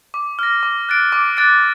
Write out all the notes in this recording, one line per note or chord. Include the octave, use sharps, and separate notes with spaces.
D6
F6 A#6
D6
F#6 A6 D7
D6
F#6 A6 D7